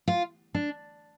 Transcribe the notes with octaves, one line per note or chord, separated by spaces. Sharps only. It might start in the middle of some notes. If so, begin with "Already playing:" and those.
F4
D4